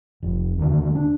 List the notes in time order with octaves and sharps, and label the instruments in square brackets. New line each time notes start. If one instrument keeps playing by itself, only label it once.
[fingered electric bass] F1
D#2 D3
D4